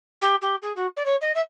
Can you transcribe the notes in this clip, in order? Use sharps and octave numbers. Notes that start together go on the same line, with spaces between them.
G4
G4
G#4
F#4
D5
C#5
D#5
E5